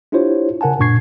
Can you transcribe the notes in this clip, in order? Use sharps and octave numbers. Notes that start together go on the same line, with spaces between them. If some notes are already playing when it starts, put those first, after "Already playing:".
D4 E4 F4 G4 C5 C#5
C#3 A#4 F#5 G#5 A5
F#2 A#2 D4 C#6 G#6 C7